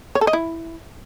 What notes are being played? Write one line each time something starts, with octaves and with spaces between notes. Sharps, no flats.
C#5
A4
D#5
E4